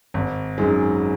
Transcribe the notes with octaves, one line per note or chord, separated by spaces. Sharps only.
G#1
F#2 D#3 G#3